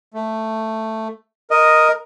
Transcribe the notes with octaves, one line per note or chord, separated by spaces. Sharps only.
A3
A#4 D#5